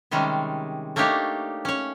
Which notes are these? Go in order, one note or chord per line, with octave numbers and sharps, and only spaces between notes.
C3 D#3 G3 G#3 C#4
A3 A#3 D4 D#4 G4 C#5
C#4 C#5